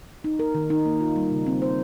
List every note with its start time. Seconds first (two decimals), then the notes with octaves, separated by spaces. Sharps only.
0.24 D#4
0.39 A#4
0.55 D#3
0.70 D#4
0.86 A#3
1.01 F4
1.16 G3
1.31 C#3
1.47 C4
1.62 C5